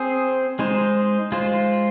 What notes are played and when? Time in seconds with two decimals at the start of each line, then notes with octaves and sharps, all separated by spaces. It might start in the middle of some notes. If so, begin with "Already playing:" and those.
Already playing: C4 G#4 C5
0.59 G#3 D#4 C5
1.32 G#3 F4 C5